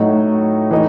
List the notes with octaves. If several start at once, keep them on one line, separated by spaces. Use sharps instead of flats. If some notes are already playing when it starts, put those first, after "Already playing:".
Already playing: A2 F#3 A3 D#4 F#4
E3 A3 D#4